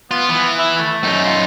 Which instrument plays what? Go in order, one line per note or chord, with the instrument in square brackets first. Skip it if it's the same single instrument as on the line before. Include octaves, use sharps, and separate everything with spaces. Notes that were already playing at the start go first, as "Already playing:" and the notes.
[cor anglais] B3 [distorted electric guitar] F4
[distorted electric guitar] E3
[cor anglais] E4
A3
[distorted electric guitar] F#2 D#4
[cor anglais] F4